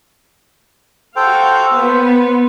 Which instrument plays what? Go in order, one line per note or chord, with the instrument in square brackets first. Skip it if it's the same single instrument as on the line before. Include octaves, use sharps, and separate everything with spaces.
[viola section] F#4 F5 [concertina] A4 C5 G5
[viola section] B3 [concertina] C5